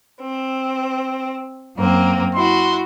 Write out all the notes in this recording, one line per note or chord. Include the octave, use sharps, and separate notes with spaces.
C4
F#2 A#3 C4
E4 F#4 C6